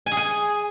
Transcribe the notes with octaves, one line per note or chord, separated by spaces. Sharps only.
G#5
G#4
G#5